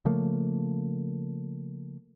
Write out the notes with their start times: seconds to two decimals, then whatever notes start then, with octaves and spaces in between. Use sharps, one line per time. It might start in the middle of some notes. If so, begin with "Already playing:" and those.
0.05 C#3 F3 A3 A#3